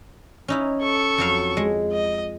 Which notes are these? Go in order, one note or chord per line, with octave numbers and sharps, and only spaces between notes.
C#4 D#4 E4
A4 C#6
F2 F#3 F5
G#3
D#5